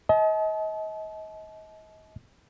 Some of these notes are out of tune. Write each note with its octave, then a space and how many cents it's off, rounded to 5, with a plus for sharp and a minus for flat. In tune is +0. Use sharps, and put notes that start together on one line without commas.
D#5 +35 A5 -40